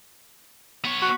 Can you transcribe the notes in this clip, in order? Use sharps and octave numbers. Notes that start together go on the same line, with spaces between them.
B3 C#5
F#4